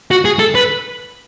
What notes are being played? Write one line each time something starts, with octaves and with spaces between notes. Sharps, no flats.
F#4
G#4
A4
B4